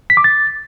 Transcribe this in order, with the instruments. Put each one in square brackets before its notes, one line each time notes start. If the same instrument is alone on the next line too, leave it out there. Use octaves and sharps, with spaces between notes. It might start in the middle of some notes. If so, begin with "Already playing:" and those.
[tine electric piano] B6
D6
A6